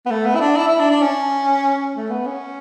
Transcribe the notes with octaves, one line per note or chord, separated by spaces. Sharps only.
B3
A3
B3
E4
D4
E4
E4
D4
D4
C#4
A3
B3
C#4